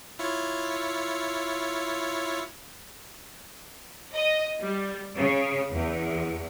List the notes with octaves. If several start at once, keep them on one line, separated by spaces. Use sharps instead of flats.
E4 F4 C#5
D#5
G3
C#3
E2